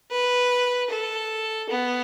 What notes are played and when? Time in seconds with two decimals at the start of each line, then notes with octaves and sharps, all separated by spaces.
0.11 B4
0.90 A4
1.69 B3